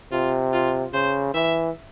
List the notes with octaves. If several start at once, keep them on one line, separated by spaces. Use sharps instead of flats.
C3 F4
F4
C#3 C5
E3 E5